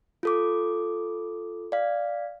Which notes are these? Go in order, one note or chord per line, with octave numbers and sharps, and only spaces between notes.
F4 A4 D6
D5 F5